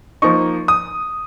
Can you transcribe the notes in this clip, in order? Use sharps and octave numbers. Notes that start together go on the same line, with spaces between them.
F3 A#3 D#4 C#6
D#6